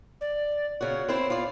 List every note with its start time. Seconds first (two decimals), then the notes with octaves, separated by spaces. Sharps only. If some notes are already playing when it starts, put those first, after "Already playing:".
0.21 D5
0.81 C#3 F#4 C#5
1.09 C4 E4 C5
1.30 F4 D5